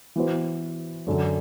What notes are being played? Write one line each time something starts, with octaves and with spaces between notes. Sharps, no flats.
E3 B3 F#4 C5
F#2 D3 F#3